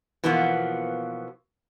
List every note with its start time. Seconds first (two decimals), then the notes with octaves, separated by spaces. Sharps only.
0.24 B2 E3 F3 A#3 B3